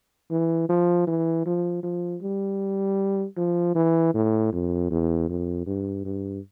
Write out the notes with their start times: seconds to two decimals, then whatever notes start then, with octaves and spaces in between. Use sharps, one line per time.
0.30 E3
0.69 F3
1.07 E3
1.46 F3
1.83 F3
2.22 G3
3.37 F3
3.75 E3
4.14 A2
4.52 F2
4.91 E2
5.29 F2
5.66 G2
6.05 G2